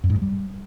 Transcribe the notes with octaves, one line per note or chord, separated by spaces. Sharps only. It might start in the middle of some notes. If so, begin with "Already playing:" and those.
F#2
G#2
G2
G3